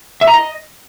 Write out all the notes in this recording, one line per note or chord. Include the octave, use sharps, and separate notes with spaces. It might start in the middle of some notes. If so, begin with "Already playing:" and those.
E5
A#5
D#5